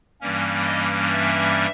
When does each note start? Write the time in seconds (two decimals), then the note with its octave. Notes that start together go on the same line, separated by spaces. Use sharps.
0.21 G2 E3 G3 A#3 C#4
0.67 D#5
1.12 E5